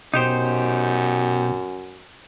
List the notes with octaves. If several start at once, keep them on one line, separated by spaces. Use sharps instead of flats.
F#2 B2 D#4 G4 C5